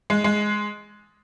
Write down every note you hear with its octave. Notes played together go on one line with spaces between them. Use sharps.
G#3
G#3